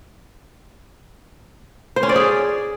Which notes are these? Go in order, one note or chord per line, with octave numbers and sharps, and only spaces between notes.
C5
C#4
D5
G#4